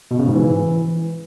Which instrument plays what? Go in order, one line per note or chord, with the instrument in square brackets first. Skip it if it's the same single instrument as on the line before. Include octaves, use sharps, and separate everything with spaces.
[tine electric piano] B2
C#3
G#2
E3